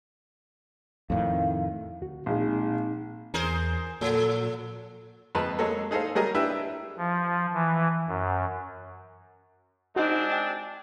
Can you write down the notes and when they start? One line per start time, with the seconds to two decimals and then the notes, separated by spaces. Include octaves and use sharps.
1.10 F2 A2 D#3 F5
2.01 D2 F#4
2.26 A#1 A#2 G#3 C4 D#4
3.34 E2 G#4 A#4 C5
4.01 A#2 F3 A4
5.35 F2 G#3 B4 A5
5.59 F#3 G#3 A#3 A4
5.91 D#4 G#4 A4 C5 D#5 F5
6.15 F#3 G3 G#4 A#4 D#5
6.34 D4 E4 G4 B4 E5
6.98 F3
7.53 E3
8.08 F#2
9.96 G#3 C4 D4 D#4 F#4
10.31 G5 A6